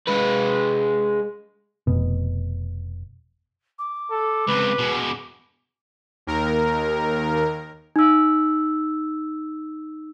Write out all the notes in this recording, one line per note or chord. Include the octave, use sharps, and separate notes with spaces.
G#3 B4
F1 B2
D6
A4
C#2 C4 B4
B2 G#3
D#2 A#4
D#4 E6